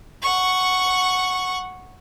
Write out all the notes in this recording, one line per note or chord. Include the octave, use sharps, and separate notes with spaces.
F#5 C#6